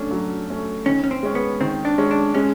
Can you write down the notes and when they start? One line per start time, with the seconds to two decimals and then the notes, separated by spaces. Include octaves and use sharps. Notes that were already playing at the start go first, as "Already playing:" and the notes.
Already playing: F#3 A3 C#4 D4
0.11 F#3
0.49 A3 C#4
0.86 D#3 C#4
1.04 C#4
1.11 C4
1.23 G#3 C#4
1.35 B3
1.61 D#3 C4
1.85 D4
1.98 G#3 C#4
2.11 D4
2.34 G#3 C#4